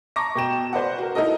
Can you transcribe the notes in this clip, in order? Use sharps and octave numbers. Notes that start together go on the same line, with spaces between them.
A5 A#5 C#6 D6 A#6
B2 G5 E7
B4 C5 D5 F#5
F#4 A#4
D#4 E4 A4 A#4 D#5